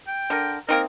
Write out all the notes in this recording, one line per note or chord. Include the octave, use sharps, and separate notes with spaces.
G5
D3 A#4
A#3 C4 D#4 A#4